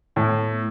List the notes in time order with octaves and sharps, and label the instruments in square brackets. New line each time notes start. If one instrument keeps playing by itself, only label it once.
[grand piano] A2 [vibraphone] B3
[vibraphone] A3
B3
A3